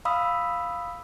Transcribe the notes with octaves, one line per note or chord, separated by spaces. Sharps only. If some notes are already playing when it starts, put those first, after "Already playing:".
F5 B5 D#6 E6 B6